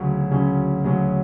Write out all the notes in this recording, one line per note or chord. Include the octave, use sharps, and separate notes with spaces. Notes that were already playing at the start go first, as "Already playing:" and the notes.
Already playing: D2 C#3 F#3 C#4
D2 C#3 F#3 C#4
D2 C#3 F#3 C#4